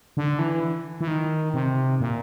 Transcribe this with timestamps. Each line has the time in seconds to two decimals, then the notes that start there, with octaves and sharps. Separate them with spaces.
0.17 D3
0.39 E3
1.01 E3
1.08 D#3
1.54 C3
2.01 A#2